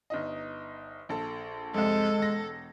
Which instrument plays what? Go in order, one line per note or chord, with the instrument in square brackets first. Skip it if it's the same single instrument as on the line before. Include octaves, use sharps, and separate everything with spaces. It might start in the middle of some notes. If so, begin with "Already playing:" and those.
[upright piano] G1 D#4 D#5
A#1 A4
[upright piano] C2 F2 [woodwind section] G#3 [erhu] A4
[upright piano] E1 A#6